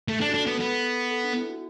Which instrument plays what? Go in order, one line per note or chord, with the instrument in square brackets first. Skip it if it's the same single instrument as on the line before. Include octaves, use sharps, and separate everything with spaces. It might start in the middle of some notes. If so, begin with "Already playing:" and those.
[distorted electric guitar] A3 [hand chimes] A4
[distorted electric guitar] D4
[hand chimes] F#4
[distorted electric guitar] D4 [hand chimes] A4
[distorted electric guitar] B3
[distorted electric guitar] B3 [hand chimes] A4
[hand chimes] A4
D4
E4
F#4